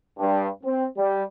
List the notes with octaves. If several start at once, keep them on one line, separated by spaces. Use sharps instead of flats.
G2
C4
G3